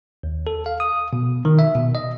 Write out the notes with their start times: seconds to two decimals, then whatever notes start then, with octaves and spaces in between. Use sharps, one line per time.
0.23 D#2
0.47 A4
0.66 F5
0.80 D#6
1.13 B2
1.45 D#3
1.59 E5
1.75 B2
1.95 D#5